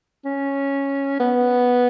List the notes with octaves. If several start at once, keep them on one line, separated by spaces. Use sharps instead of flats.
C#4
B3